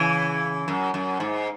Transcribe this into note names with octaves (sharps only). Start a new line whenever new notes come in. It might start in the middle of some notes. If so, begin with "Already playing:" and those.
Already playing: C#3 E3
F#2
F#2
G#2